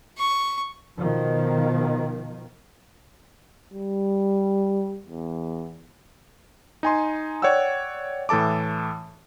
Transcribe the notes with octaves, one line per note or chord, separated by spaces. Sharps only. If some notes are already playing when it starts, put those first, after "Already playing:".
C#6
B2 D#3 F3
G3
E2
D#4 G#5 C6
C#5 D5 F#5 G5 E6
A2 E3 A4 A5 D6